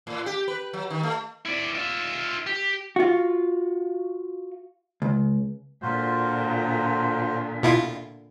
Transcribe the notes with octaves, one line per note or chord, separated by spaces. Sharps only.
A2
G4
B4
F#3
D#3
A3
E4 D5
F4 E5
G4
F4 F#4
C#2
A#2 D3 F4 F#4 C5
B2 E4 F4